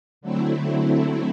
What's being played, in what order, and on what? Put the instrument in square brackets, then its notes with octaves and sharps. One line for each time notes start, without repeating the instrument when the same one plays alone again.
[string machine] D3 F#3 A3 C4 E4